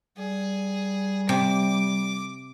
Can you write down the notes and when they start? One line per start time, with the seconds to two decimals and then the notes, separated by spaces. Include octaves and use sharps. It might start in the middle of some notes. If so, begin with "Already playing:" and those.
0.18 G3 G#4
1.29 C3 D6